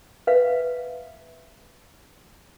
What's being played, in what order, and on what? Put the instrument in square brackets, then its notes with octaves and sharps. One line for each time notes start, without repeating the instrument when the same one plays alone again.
[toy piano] B4 E5 F5